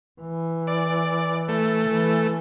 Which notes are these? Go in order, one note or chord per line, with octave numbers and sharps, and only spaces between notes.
E3
D5
A3
E3